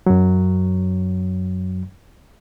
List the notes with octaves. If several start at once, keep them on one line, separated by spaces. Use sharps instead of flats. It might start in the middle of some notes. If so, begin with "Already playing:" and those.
F#2 F#3